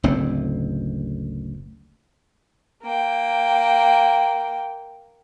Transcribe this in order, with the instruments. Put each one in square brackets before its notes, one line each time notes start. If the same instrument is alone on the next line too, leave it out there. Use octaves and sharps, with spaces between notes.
[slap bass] F#1 D2 A2 C4
[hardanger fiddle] A#3 G5